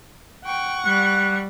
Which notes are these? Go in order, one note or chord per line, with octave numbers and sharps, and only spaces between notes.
F#5 G5 C#6
G3 F#6